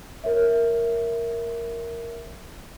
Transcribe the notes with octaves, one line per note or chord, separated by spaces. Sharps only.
A#4 C#5 E5